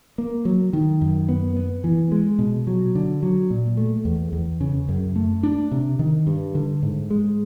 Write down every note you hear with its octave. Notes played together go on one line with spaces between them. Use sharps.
A#3
F#3
D#3
F#2
B3
B3
E3
G#3
B2
F#3
D3
F#3
A#2
A3
E2
E2
C#3
F#2
A3
D4
C3
D#3
G2
D3
G#2
G#3